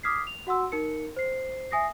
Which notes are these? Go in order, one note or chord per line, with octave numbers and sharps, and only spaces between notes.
D6 D#6 F6 G#6 B6 C7
F7
F#4 F#5 C6 E6
D#4 A#4 C#7
C5 C7
E5 G#5 D#6 A#6 C7